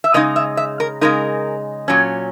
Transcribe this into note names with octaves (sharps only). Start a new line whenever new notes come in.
E5
C#3 G#3 D#4 D#5
E5
E5
A#4
C#3 G#3 D#4 A#4
A#2 F#3 C#4